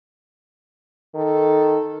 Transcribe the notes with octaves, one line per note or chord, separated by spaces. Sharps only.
D#3 A4